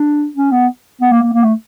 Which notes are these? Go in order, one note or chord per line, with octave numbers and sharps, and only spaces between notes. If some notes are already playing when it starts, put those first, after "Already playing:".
Already playing: D4
C#4
B3
B3
A#3
A#3
A#3
A3